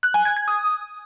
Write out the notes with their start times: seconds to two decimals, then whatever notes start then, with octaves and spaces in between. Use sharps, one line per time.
0.03 F#6
0.14 G#5
0.25 G#6
0.37 G#6
0.48 D#6